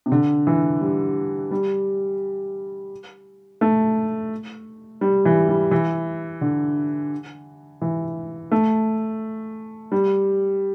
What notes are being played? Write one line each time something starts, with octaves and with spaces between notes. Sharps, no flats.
C3
D3
E3
G3
G3
A3
G3
E3
G3
E3
D3
E3
A3
G3